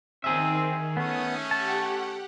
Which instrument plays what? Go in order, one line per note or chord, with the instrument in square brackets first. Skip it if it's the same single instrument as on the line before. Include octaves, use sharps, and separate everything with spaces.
[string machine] D#3 [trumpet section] C4 [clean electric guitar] G#4 E5
[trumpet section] A3 C#4 [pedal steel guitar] B3 [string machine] D#6
[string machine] G4 F#5 [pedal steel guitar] A5